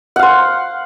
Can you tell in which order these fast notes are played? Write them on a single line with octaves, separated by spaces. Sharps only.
F#5 F5 C5